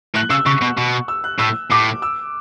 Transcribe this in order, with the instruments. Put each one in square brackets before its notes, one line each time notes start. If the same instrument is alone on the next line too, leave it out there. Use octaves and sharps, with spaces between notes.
[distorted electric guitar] A2 [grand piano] F#6
[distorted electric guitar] C#3 [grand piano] E6
[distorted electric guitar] C#3 [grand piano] C#6
[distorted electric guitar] B2
[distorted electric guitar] B2 [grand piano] C#6
[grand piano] E6
F#6
[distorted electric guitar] A2 [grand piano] E6
[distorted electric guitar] A2 [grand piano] D6
[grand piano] E6